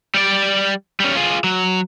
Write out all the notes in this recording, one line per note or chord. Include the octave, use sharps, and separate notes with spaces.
G3 D5
G3 C#4
F4 G#4
F#3